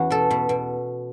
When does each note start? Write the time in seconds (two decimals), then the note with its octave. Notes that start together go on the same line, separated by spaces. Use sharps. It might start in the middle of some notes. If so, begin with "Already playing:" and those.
Already playing: E2 B3 C#4 F#4
0.10 B2 A4
0.31 B2
0.49 B2